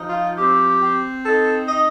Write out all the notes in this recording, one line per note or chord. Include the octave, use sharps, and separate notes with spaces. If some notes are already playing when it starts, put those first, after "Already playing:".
Already playing: F3 D#4
F4
C4 G4
C4
D#4 A4
D#4 D#5